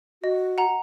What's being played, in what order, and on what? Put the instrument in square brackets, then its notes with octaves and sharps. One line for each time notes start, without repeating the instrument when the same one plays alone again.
[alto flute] F#4 [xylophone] D#5
[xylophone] F#5 A#5